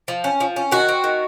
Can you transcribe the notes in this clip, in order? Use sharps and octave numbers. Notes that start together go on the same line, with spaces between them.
F3
C#4
F3
C#4
D#3 F#4
C4
D#3